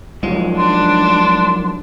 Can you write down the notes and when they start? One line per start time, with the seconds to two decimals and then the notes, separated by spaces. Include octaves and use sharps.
0.23 G#2 F3 F#3 G#3
0.57 D4 C6